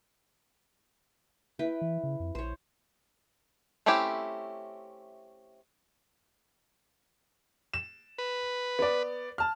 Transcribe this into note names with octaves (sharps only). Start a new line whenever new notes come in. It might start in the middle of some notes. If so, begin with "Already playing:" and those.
E4 B4 G5
E3
C#3
F2
A#1 C5 C#5
A3 C4 C#4 E4 G4
E7
B4
B3 D5
A5 F6